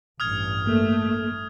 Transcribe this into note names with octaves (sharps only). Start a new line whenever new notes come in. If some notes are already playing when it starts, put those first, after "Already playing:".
A1 G2 D#6 F6 G#6
A3 A#3